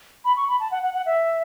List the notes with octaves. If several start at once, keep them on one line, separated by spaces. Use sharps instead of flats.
B5
C#6
B5
A5
F#5
F#5
F#5
E5